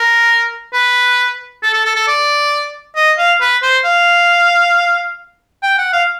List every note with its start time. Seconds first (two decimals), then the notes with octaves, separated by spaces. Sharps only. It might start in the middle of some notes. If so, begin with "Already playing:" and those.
Already playing: A#4
0.74 B4
1.63 A4
1.74 A4
1.86 A4
1.96 A4
2.08 D5
2.96 D#5
3.18 F5
3.41 B4
3.63 C5
3.85 F5
5.63 G5
5.78 F#5
5.93 F5